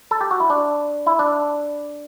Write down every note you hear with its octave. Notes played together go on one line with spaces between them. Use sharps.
A4
G4
F#4
E4
D4
E4
D4